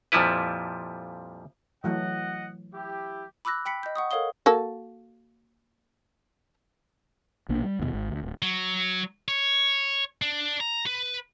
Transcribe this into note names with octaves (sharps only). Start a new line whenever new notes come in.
F2 A#2 F3 G3 E4 B4
E3 F#3 A3 D#5 F#5
E4 G4
B5 D6 E6 F#6 A#6
G5 B5 B6 C#7
D#5 G6
F#5 C#6 D#6
A4 A#4 C#5 F5 D#6 G7
A#3 F#4 A4
A#1 B2 A#3 D4
G3
D#2 G#2 B2
G#1
D2
D1
F#3
C#5
D4
A#5
B4